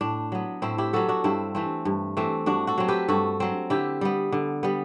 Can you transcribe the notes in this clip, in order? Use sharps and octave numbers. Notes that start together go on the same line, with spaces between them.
A2 D4
F#3 B3
A2 C4 E4
E4 G4
F#3 B3 F#4 A4
D4 F#4
G2 C4 E4
E3 A3 C4
G2
E3 A3 C4
G2 D4 F#4
F#4 A4
F#3 C4
G4 B4
G2 F#4 A4
F#3 C4
D3 E4 G4
G3 B3
D3
G3 B3